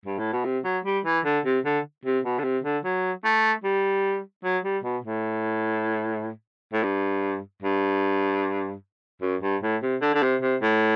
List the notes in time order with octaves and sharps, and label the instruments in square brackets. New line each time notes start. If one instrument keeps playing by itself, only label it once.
[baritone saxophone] G2
A2
B2
C3
F#3
G3
E3
D3
C3
D3
C3
B2
D3
C3
D3
F#3
A3
G3
F#3
G3
B2
A2
A2
G2
G2
F#2
G2
A2
C3
D3
D3
C3
C3
A2